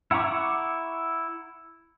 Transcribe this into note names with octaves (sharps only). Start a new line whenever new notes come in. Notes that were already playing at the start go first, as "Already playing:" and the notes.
E4 F#5 A#5 C#6 D6